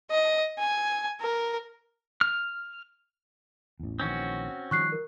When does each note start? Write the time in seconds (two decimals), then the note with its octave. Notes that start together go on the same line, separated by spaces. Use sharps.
0.11 D#5
0.59 G#5
1.21 A#4
2.21 F6
3.80 A1 E2
4.00 A#1 D#3 E3 C4 C#4 F#4
4.71 D#3 F3 G3 C#6 F#6 C7
4.92 A#4